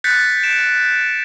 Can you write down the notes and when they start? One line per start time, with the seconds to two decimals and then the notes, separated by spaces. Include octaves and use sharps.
0.04 F#6 G6 A6 B6 C#7
0.43 D7 E7